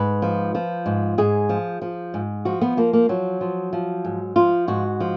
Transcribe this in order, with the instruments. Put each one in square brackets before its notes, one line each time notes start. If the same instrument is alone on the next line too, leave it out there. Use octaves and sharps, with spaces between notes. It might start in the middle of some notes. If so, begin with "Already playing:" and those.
Already playing: [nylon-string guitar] G#2 B4
F3
F3
G#2
G#2 G#4
F3
F3
G#2
F3 F#4
B3
F3 A#3
A#3
F3 F#3
F3
F3
G#2
F3 F4
G#2 F#4
F3